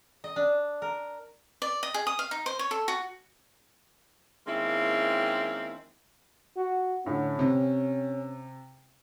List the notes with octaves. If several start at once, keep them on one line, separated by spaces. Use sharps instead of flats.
D#5
D4
A#4
D5
D#5
G#4
D#6
F5
D#4
C5
C#5
A4
F#4
D#3 G#3 A#3 C4 C#4 E4
F#4
A2 D3 C#4
C3